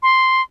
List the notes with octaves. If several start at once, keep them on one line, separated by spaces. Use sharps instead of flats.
C6